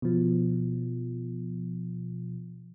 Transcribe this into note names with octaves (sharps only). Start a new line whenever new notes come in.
B2 F3